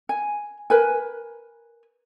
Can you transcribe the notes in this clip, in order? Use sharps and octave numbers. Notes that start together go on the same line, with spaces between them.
G#5
A#4 B4 G#5